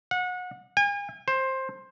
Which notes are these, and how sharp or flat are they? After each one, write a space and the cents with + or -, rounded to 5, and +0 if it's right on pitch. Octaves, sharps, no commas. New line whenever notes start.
F#5 -30
G#5 -40
C5 +15